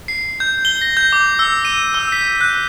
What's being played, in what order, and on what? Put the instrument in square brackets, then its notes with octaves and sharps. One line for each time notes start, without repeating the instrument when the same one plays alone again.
[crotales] C7
G6
G7
A#6
G6
D6
E6
D#7
E6
B6
F#6